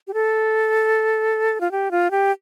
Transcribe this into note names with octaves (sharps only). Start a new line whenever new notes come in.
G4
A4
F4
G4
F4
G4